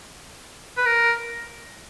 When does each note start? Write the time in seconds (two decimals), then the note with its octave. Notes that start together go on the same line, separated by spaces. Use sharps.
0.77 B4
0.86 A#4